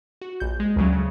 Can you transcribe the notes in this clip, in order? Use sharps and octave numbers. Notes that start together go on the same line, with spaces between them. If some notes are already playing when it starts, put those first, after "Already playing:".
F#4
A#1 G6
G#3
D2 C#3 F#3
C#3